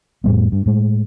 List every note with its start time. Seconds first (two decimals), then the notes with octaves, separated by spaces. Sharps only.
0.24 F2 A2 G3 B3
0.52 G2
0.66 A2 G#3